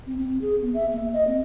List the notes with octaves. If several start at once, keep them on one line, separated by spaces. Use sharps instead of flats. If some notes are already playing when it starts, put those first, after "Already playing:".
C4
C4
G#4
B3
E5
A#3
D#5
C4